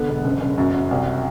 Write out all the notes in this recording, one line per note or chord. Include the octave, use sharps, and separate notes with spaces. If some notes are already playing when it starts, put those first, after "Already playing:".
Already playing: D3 B3
E1
F#1
F#1
F#2
F#2
C2